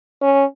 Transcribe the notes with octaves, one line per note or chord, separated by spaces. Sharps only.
C#4